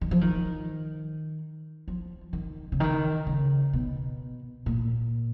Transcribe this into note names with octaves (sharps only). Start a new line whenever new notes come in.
D#3
F3
D#3
F3
D#3
C#3
D#3
C#3
B2
A#2